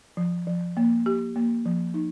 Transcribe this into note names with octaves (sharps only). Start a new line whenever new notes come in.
F3
F3
A#3
G4
A#3
F3
D#4